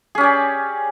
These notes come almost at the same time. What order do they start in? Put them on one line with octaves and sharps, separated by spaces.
G#4 C#4 G4 D5